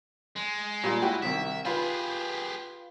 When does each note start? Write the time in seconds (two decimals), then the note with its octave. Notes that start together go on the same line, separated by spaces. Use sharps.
0.36 G#3
0.83 A#2 G3 F4
1.02 E4 F#4 G5
1.22 C2 D#3 E5
1.65 F4 G4 G#4 B4